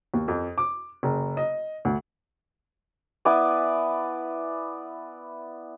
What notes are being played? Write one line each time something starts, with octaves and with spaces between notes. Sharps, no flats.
D#2
F2
D6
F#1
D#5
D2
B3 E4 D5 G#5